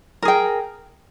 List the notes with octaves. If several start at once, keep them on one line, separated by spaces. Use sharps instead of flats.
G#4 A#4 G5